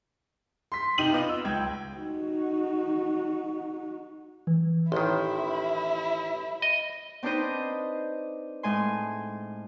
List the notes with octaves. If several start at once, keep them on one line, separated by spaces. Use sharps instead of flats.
C6 B6
C3 D#4 G5 D#7 F#7
B3 F4 B4 D#5
E6
C#2 G5 G#6
D#4 F#4
E3
A1 D#3 E4 C6
B5
D#5
C4 D4 D#4 B4 C5 D#5
A2 G#3 G#5 C6